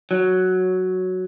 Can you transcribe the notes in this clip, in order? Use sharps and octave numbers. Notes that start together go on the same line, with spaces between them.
F#3